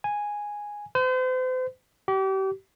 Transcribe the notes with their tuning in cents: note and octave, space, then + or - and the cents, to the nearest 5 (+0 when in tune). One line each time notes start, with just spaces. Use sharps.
G#5 -5
C5 -40
G4 -35